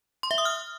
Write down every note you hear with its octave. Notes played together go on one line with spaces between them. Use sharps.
C6
E5
D#6
F6